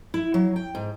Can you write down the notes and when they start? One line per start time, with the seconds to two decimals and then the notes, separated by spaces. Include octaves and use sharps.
0.14 E4
0.34 F#3
0.56 G5
0.75 G#2